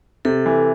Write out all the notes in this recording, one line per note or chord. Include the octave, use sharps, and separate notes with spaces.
C3 A4
E3